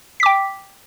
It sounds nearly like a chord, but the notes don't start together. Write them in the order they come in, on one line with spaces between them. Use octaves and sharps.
B6 D6 G5